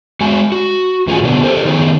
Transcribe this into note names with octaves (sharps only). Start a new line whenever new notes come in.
G#3 F#4 G#5
F#4
E2 A2 F4 G#4 F#5 G#5
B2 D3 F#3 B3
G4 A4 A#4 C5
D#3 B3 D#4 E4 G#4